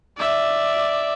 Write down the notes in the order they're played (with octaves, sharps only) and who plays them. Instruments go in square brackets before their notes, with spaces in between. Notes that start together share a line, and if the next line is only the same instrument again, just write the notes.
[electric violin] D5 E5